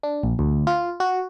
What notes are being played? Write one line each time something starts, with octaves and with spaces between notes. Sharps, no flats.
D4
A#1
D2
F4
F#4